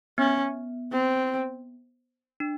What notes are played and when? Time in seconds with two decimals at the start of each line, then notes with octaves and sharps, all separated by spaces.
0.18 B3 C#4
0.92 C4
2.40 D4